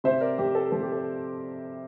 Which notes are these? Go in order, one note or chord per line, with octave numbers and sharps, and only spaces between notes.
C3 C5 E5
A#4 D5
F2 G4
A4
F3 A4
G4
A4